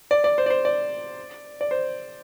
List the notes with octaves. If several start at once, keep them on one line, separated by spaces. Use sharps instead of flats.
D5
D5
C5
D5
C5
D5
D5
C5